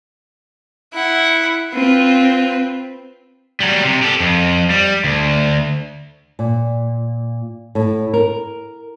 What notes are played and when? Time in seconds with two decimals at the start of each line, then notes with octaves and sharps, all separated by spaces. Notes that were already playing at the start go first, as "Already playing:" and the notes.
0.94 E4 F#5
1.74 C4 F4 B4
3.60 F#3 G3
3.84 C3
4.02 G4 A4
4.20 F2
4.70 G3
5.04 D2
6.39 A#2
7.75 A2
8.14 A#4